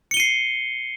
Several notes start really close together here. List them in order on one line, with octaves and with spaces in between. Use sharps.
C#7 G7 D#7 C7